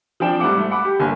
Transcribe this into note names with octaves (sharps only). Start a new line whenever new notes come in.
F3 C4 D4 G5 E7
G#2 G3 A3 F#5 D6
A3
F#5 B5 D6
G4
G1 D3 A#3 G#5